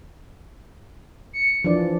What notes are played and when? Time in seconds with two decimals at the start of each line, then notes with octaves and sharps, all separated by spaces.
1.33 C#7
1.64 E3 F3 D4 D5